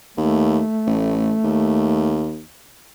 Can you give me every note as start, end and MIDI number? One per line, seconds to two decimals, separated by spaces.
0.17 0.61 39
0.17 2.26 57
0.87 1.35 33
1.44 2.42 39